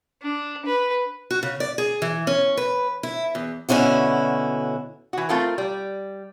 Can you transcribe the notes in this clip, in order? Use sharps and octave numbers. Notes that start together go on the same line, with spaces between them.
D4
B4
F#4
C#3
D5
G#4
E3
C#4
B4
E4
E2
B2 D3 C#4 E4 F#4
E3 F#4
A3 C4 F4 A4 A#4
G3